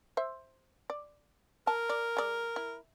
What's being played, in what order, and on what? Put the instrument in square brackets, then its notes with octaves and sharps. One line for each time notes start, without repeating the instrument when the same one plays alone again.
[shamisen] C5 E5
D5
[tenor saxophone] A#4 [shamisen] A5
[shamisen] D5
G#3 D5
E4